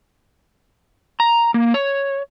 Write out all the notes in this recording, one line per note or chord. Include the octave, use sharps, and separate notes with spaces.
A#5
A#3
C#5